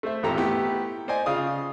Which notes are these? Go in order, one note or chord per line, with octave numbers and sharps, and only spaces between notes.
A3 C5 E5
G#1 E2 A#2 G4 A4 A#5
A3 B3 E4 G4
C5 D5 D#5 G#5
C#3 F4 G#4 F5 D#6